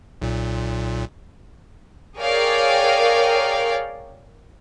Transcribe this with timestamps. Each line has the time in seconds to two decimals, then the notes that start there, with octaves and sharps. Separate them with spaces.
0.22 B1 A#2
2.18 G#4 A#4 C#5 D5 F5 G5